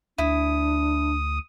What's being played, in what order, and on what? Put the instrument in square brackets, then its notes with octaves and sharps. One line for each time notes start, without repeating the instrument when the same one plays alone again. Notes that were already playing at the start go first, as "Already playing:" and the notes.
[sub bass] D2 [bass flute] D4 [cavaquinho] E4 [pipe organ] D#6